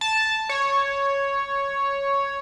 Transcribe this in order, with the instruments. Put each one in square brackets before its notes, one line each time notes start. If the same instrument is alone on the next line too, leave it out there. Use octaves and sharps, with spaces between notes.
[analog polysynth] A5
C#5